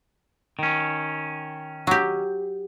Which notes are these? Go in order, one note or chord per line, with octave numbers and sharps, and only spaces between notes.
D#3 C#4
F#3 G4